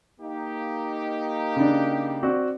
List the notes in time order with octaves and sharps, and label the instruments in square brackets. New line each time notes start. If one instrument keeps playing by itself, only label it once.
[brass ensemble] A#3 D#4 G4
[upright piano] C#3 D4
C4 F#4 D5